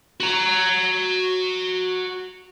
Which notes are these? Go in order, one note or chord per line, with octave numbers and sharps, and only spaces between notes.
F#4 A#5